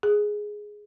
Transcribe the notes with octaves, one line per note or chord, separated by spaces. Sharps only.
G#4